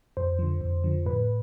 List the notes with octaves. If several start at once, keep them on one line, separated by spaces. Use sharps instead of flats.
F2 C5
D3 F3
F2
D3 F3
A2 B4